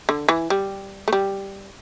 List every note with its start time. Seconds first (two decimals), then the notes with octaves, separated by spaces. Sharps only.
0.09 D3
0.28 E3
0.50 G3
1.08 A3
1.13 G3